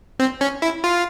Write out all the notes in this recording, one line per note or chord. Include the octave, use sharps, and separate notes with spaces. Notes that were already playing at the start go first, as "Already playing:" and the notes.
C4
C#4
E4
F4